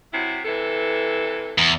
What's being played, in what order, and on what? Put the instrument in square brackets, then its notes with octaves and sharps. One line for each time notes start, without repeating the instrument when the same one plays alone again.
[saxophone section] C3 F#3 E4
C3 E3 A4
[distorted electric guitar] E2